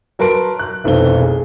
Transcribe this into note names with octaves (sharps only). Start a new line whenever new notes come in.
F#3 A#4 B4 A5 C6 D7
F#6
F1 B1 E3 C4 A4 G7
G#4